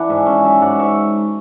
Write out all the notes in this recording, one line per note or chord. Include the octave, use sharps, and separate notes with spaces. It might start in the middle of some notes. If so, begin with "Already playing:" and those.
Already playing: E3 D4 F#5
G#2 E5 G#5
C#4 E5 G#5
F#3 E5 G#5
G#2 D5 F#5
G#2 C#5 E5